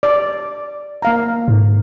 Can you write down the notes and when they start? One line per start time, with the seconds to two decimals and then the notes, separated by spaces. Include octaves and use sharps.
0.03 D5
1.02 A#3 F5 A#5
1.48 G#2